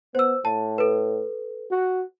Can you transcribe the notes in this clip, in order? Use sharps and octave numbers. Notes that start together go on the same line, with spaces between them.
B3 C5 E6
A2 A5
A4 B4
F#4